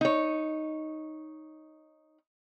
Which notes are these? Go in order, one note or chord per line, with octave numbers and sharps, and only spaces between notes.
D#4 C#5